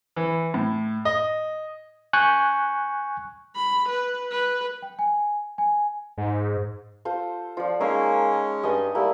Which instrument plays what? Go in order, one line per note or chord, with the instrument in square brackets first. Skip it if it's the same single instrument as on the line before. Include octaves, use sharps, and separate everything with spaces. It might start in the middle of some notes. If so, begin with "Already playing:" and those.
[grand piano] E3
A2
D#5
[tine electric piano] G#5 C#6 F#6 G6
[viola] B5
B4
B4
[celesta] G5
G#5
G#5
[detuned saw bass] G#2
[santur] F4 A4 C5
[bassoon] F3 [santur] F4 D5
[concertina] G#3 C#4 [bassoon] A#3 [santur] D#4 C#5 E5
[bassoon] G2 [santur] D#5 G#5
[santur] G3 A#3 [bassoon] A3 [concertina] E4